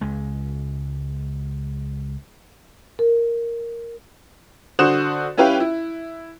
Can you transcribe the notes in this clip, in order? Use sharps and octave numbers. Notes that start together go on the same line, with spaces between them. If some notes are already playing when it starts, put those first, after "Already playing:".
C#2 G#3
A#4
D3 F#4 C5 D#6 F#6 E7
C#4 E4 G4 B4 F5 G5
E4